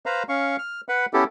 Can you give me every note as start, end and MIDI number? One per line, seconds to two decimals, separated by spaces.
0.06 0.23 71
0.06 0.23 72
0.06 0.23 77
0.06 0.23 82
0.06 0.23 83
0.29 0.56 61
0.29 0.56 77
0.29 0.56 85
0.59 0.81 89
0.89 1.06 71
0.89 1.06 78
0.89 1.06 83
1.14 1.24 59
1.14 1.24 61
1.14 1.24 64
1.14 1.24 67
1.14 1.24 69